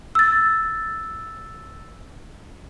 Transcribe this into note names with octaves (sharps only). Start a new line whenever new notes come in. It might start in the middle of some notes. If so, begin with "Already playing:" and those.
E6 A6